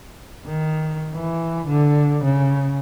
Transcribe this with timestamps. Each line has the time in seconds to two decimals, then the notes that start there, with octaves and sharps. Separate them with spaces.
0.46 D#3
1.15 E3
1.67 D3
2.24 C#3